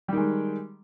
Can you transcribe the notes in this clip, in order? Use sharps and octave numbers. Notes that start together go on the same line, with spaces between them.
D#3 G3 G#3